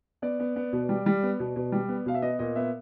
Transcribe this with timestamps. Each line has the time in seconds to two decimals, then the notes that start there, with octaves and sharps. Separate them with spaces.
0.22 B3 D5
0.40 B3
0.56 B3
0.73 B2
0.89 G3
1.06 G3
1.23 B3
1.40 B2
1.56 B2
1.72 G3
1.88 B3
2.06 B2 F5
2.14 E5
2.22 B3 D#5
2.39 A#2 D#5
2.55 B3 E5